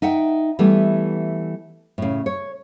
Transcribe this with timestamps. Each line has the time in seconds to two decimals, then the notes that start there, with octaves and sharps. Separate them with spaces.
0.02 D#4 E5 F#5 G5
0.59 E3 G3 A3 B3
1.98 A2 C#3
2.26 C#5